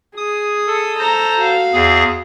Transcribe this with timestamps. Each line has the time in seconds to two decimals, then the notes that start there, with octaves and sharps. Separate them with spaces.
0.17 G#4 D#6
0.67 A4
0.99 C5 A#5
1.39 F#4 F5
1.73 E2 G#4